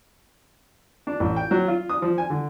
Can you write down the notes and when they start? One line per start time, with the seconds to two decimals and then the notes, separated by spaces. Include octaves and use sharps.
1.07 D4
1.20 A1
1.36 G5
1.51 F#3
1.68 F4
1.89 D#6
2.02 F3
2.18 G#5
2.30 D3